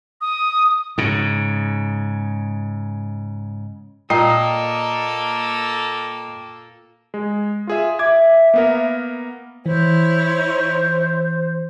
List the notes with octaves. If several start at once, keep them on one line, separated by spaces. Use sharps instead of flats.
D#6
G#2 C#3
A#2 A#3 A4 D#5 G5 A#5 D#6 C7
G#3
F4 G#4 E5
E5 D6 G#6
A#3 B3 A#4
E3 E4 C5 C#5